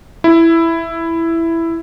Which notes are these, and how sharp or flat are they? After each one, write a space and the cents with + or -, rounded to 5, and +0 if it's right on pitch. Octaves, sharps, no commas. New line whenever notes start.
E4 +5